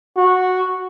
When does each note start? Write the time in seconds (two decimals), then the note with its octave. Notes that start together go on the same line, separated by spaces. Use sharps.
0.16 F#4